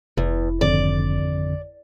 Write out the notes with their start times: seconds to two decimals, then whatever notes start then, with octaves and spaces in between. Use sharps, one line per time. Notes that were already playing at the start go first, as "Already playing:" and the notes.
0.17 F1 E2
0.61 G#1 F2 D3 D5